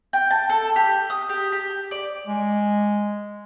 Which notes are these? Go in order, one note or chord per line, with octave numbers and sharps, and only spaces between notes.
G5
A5
A4
G4
D#6
G4
G4
D5
G#3